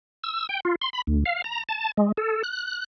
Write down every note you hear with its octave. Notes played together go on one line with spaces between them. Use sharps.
E6
G5
F4
C6
B5
D2
F5
A#5
A5
G#3
A4
F#6